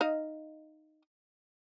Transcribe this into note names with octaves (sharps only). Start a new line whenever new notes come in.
D#4 D#5 F5